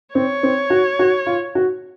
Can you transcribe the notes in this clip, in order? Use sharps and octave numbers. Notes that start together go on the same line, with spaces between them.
C4 C#5
C4
F#4
F#4
F4
F#4